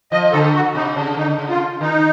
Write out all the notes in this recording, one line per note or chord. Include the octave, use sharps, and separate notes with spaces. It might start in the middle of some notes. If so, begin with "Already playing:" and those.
F3 D#5
D3 A4
F#4
C3 D#4
C#3 D4
D3 D#4
C#3
F4
D#3 D#4